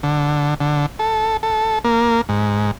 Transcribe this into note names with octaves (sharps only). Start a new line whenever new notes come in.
D3
D3
A4
A4
A#3
G#2